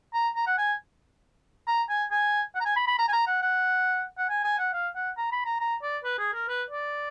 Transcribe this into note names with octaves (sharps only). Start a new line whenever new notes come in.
A#5
A#5
F#5
G#5
A#5
G#5
G#5
F#5
A#5
G#5
B5
B5
A#5
G#5
A#5
F#5
F#5
F#5
G#5
G#5
F#5
F5
F#5
A#5
B5
A#5
A#5
D5
B4
G#4
A#4
B4
D5